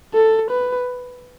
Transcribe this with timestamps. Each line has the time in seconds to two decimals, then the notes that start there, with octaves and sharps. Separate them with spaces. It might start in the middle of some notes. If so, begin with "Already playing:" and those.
0.14 A4
0.51 B4